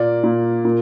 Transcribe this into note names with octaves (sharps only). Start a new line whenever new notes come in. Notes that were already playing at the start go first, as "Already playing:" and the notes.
Already playing: A#2 A#3 D5
A#2
A#2